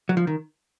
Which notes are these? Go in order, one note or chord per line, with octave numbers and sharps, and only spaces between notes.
F#3
F3
D#3